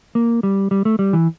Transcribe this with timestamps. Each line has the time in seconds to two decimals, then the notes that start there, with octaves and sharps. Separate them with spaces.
0.15 A#3
0.43 G3
0.71 G3
0.85 A3
0.99 G3
1.13 E3